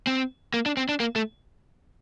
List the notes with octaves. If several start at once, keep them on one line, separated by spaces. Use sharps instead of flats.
C4
A#3
D4
C4
D4
A#3
A3